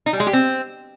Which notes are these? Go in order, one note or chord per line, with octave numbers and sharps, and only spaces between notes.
D#4
G3
G#3
G4
C4